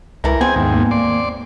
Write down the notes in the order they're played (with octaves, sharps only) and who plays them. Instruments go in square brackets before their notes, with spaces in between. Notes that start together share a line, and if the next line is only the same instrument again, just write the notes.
[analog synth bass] C#2 [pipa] E3 A3 E4 [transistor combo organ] A#4
[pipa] F3 G#3 C4 [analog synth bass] B3 [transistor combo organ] G#4 G#5
[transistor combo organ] D#2 G#2
[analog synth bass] A#3
[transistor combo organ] D5 C6